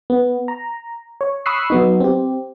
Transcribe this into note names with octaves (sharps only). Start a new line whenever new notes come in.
B3
A#5
C#5
B5 C#6 D#6 E6 F#6 C7
F#3 B3 D#4
C4 G4